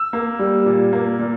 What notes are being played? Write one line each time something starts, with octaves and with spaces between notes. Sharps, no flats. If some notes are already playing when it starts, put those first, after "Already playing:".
Already playing: E6
A#3
G3
A#2
A#3
A#2